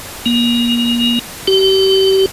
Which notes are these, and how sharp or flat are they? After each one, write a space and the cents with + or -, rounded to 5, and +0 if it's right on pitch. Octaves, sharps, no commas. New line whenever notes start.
A#3 +35
G4 -35